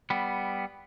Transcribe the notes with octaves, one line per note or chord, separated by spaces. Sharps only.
G3 B3